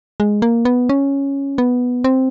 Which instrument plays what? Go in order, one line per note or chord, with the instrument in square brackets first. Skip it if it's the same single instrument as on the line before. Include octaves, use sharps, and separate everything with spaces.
[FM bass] G#3
A#3
B3
C#4
B3
C4